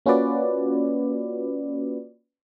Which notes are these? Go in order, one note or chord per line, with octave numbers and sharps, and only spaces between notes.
A#3 C#4 F4 F#4 B4 D5